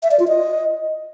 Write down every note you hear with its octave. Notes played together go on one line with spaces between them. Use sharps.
E5
D5
F4
D#5